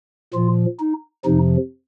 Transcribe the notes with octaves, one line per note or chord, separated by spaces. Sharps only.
A#2 F3 F4
D#4
F2 C3 F3 D#4